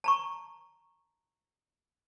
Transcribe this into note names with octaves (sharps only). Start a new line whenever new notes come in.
A5 A#5 C#6